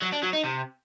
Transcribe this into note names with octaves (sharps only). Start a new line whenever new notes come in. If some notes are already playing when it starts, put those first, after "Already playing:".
F#3
D4
F#3
D#4
C3